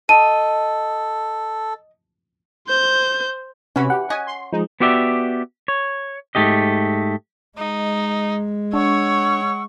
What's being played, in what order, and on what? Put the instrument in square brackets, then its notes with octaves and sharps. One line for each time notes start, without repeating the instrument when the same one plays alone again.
[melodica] A4 [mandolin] D#5 [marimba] A5 [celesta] D#7
[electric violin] C5 G6
[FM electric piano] C3 [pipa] E3 B5 [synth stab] C#4 F#4
[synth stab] G4 [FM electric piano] F#5
[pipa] C#4 F#4 D#5 [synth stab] G#5
[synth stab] C6
[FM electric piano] F3 G#3 [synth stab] D#4
[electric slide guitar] B3 F#4 G4 D5 E5
C#5
G#2 A3 G4 D#5
[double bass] G#3 [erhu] D#4
[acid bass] D4 [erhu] C#5 [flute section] F#5 C#6 E6